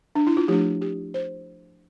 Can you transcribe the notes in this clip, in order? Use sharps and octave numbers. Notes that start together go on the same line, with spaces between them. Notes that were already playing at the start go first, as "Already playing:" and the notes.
D4
E4
F4
F3 A3 D4 G4
G4
C5